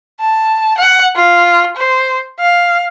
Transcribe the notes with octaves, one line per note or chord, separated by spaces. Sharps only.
A5
F#5
F4
C5
F5